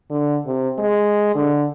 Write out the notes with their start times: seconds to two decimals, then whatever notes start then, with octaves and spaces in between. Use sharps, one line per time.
0.10 D3
0.46 C3
0.78 G#3
1.35 D3